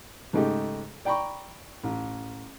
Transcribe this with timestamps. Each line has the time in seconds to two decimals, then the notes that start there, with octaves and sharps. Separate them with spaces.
0.33 G#2 C#3 A3 D#4 G4
1.05 D5 G5 A#5 B5 C#6
1.83 A1